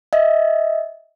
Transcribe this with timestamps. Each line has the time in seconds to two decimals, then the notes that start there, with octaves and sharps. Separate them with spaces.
0.13 D#5 E5